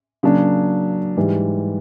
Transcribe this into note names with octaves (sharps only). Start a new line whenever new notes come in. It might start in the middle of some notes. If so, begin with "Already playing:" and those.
C#3 F#3 A#3 D4
G#2 E3 G3